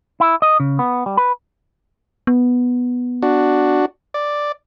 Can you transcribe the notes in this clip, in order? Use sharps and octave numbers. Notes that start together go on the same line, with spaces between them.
E4
D#5
C#3
B3
G3
B4
B3
D4 F#4
D5